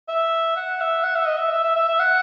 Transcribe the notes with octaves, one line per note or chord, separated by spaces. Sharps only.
E5
F#5
E5
F#5
E5
D#5
E5
E5
E5
E5
E5
F#5